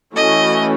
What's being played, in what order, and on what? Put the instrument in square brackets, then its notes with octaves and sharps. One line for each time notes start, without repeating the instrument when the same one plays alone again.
[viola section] E3 A3 C#4 F#4 [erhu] D#5